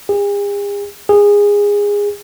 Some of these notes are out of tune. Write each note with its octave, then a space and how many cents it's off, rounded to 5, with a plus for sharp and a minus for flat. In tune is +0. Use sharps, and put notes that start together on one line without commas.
G#4 -45
G#4 -20